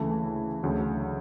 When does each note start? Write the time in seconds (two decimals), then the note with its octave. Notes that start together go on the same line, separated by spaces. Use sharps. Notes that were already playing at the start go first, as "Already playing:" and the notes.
Already playing: D2 C#3 E3 A3
0.63 D2 C#3 F#3